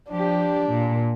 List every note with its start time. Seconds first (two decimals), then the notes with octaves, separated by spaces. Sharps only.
0.11 F3 D4 G4
0.70 A#2